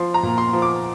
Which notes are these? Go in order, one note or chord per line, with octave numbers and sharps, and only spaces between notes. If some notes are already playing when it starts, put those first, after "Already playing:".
Already playing: F3 C6
A#5
A#2
C6
F3
D6